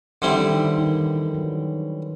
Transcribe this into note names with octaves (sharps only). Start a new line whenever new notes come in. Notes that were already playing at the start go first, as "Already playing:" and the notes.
D3 D#3 G3 C4 E4
E3
D#3
D#3
D#3
D#3
E3
F#3